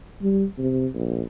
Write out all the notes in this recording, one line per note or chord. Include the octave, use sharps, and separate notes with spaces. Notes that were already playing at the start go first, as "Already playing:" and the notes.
G3
C3
A#1